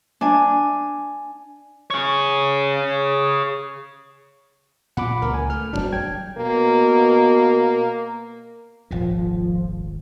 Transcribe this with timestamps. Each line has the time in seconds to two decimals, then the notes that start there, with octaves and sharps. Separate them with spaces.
0.21 D4 G#5
1.91 G#4 C#5
4.97 A#2 F#5 B5 D6
5.22 C#2 A#4
5.34 G#5
5.50 A3 F6
5.73 D1 C#2 F#3 G3 D4
5.93 G5 G#6
6.38 B2 A#3
8.91 D#1 G#1 A#2 F3